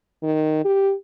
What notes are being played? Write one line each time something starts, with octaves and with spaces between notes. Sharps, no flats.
D#3
G4